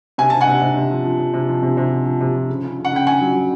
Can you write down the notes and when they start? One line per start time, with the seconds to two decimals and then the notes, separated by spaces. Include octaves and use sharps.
0.18 C3 G#5
0.30 C3 A5
0.41 F#5 G#5
0.47 C3
0.62 C3
0.77 C3
0.91 F3
1.04 F3
1.19 F3
1.34 C3
1.48 F3
1.63 C3
1.77 C3
1.91 F3
2.05 F3
2.21 C3
2.35 F3
2.49 C#3
2.64 C#3
2.78 C#3
2.85 F#5
2.92 C#3 G5
3.06 C#3 F#5 G#5
3.21 F#3
3.35 F#3